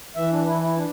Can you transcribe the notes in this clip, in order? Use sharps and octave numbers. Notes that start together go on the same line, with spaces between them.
E3 E5
D4
E3 E4
E4
D4